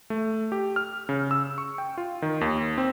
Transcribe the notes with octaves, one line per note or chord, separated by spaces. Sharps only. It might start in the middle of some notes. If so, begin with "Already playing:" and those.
A3
G4
F6
C#3
E6
C#6
G5
F4
D#3
D#2
C4